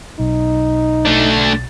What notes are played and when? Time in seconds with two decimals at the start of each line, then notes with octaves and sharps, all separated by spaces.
0.20 B1 D#4
1.05 A3 D4